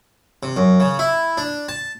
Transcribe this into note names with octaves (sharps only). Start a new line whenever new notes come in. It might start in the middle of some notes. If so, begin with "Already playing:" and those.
C3
F#2
C#3
E4
D4
A5